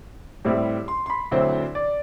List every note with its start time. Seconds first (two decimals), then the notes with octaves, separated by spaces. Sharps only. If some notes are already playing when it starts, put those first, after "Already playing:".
0.45 A2 G3 C4 E4
0.88 C6
1.06 C6
1.10 B5
1.31 D2 D3 F#3 C4 E4 C5
1.75 D5